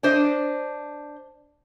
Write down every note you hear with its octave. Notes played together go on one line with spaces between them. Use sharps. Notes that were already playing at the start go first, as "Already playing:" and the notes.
D4 C5 D#5